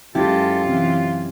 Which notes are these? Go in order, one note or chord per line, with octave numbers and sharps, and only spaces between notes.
F#2 G#3 C#4 E4 F4 G4 A4
C3 E3